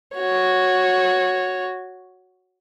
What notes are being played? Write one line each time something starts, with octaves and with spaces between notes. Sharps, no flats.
F#4 C#5